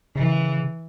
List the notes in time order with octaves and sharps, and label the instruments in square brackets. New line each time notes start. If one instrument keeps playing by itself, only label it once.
[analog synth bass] C#3 [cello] E3